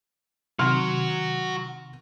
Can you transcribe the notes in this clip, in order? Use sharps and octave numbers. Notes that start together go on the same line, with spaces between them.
C3 D#3 F#3 F#4 C6 F6